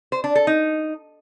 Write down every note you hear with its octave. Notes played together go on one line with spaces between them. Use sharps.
C5
D4
A4
D#4